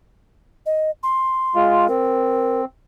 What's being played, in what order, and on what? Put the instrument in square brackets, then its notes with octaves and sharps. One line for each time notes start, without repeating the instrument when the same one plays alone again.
[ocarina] D#5
C6
[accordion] G#3 F4
[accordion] C4 [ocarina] A#4